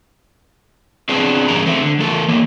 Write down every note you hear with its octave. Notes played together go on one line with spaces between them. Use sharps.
B3 C4 D4 G#4 B4
G2 C#3 E3 G#4 A#4 A#5
A3 C4
D3
E3 A3 A4 A#4
E3 A#3